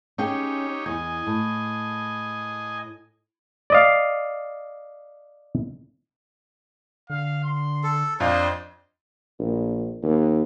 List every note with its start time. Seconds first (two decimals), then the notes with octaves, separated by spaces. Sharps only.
0.18 C#4 D#4 G4 G#4 C#5 G5
0.86 E2 D#5 G#5
1.27 A2
3.70 D5 D#5 F5
7.10 D3 F5
7.44 C6
7.83 A4
8.20 F2 D4 C5 D#5 F5
9.40 A#1
10.03 D#2